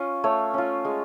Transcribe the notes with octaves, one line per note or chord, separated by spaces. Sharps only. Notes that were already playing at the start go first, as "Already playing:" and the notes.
Already playing: C#4 F4
A3 C#5
C#4 F4
G#3